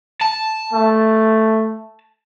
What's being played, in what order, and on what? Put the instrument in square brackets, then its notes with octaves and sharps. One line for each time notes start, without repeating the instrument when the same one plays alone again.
[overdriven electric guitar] A5
[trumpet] A3